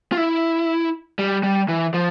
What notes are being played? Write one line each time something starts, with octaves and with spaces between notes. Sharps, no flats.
F4
E4
G3
G3
E3
F3